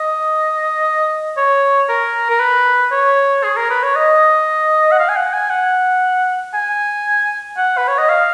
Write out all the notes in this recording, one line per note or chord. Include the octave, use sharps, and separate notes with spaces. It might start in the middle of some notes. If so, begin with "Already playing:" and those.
Already playing: D#5
C#5
A#4
A#4
B4
C#5
G#4
A#4
B4
C#5
D#5
F#5
F5
G#5
F#5
G#5
F#5
G#5
F#5
B4
C#5
D#5
F5